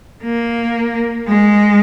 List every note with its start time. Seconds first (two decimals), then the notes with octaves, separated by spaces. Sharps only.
0.24 A#3
1.28 G#3